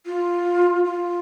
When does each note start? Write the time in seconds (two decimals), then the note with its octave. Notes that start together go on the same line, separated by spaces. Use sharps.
0.06 F4
0.84 F4